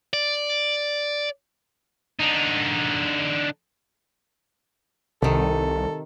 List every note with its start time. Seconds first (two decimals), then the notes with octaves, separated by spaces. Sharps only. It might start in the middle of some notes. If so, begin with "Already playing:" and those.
0.13 D5
2.20 D3 D#4
5.22 C2 C3 D#3 A4